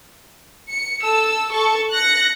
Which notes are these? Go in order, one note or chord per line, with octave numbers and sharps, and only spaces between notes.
C#7
A4 E6
A4 C#6
F#6 A#6 C#7